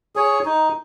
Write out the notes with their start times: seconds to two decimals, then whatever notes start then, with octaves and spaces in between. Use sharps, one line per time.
0.16 G#4 C#5
0.45 D#4